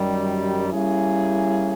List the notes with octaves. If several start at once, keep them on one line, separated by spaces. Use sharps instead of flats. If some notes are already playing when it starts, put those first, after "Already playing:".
Already playing: F#2 D#3 G3
G3 A#3 C#4 E4 G#4